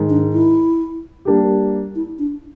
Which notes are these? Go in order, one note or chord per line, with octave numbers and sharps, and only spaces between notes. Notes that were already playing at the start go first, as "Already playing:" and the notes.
Already playing: G#2 D#3 G#3
D4
E4
G3 A#3 D4 G4
E4
D4